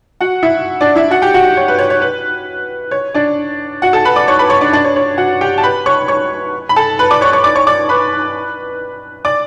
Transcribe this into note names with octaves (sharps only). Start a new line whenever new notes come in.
F#4 F#5
E4 E5
D4 D5
E4 E5
F#4 F#5
G4 G5
F#4 F#5
C#5
B4
C#5
C#5
B4
C#5
D4 D5
F#4 F#5
A4 A5
B4 B5
D5 D6
C#5 C#6
B4 B5
C#5 C#6
D4 D5
D4 D5
C#5
C#5
F#4 F#5
G4 G5
A5
B4 B5
C#5 C#6
C#5 C#6
B5
A4 A5
B4 B5
D5 D6
C#5 C#6
C#5 C#6
D5 D6
C#5 C#6
D5 D6
B4 B5
D5 D6